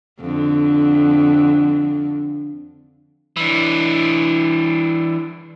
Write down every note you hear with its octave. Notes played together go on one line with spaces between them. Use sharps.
F2 D3
E3 D4